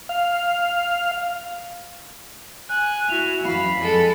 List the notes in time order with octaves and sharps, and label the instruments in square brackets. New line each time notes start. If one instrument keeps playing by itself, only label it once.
[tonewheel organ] F5
[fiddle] G#5 [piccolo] F#6
[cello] E4 F#4 [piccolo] F7
[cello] F#2 E3 [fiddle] F5 [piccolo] B5
[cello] F2 [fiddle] G#3 A4